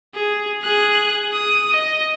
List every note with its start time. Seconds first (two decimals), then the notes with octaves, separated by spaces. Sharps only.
0.14 G#4
0.62 G#4 F#6
1.33 D#6
1.70 D#5